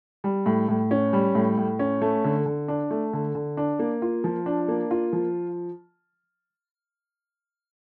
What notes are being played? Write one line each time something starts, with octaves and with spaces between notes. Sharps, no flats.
G3
A2
A2
C#4
G3
A2
A2
C#4
A3
D3
D3
D4
A3
D3
D3
D4
A#3
F4
F3
D4
A#3
F4
F3